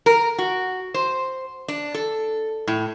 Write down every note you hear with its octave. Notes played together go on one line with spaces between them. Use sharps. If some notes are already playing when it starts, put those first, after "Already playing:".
A#4
F#4
C5
D4
A4
A2